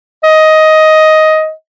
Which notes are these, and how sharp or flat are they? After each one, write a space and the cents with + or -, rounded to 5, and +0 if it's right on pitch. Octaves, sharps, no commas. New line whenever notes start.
D#5 +10